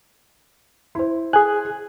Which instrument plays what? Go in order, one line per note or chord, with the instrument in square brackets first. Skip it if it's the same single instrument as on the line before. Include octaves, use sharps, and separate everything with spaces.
[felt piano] E4 C5
[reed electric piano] G#4 F#6 [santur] G#5